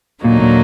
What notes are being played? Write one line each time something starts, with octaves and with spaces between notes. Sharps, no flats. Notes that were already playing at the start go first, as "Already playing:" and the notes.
D#2 A#2 D3 F#3 A#3 D#4
A#2